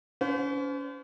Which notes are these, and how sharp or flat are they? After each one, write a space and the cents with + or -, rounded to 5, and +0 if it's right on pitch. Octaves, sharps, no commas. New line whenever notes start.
C#4 +35 C5 -40